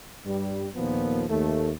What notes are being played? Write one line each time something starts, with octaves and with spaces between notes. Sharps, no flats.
G2 G3
D#2 A#2 F3 B3
D#2 A3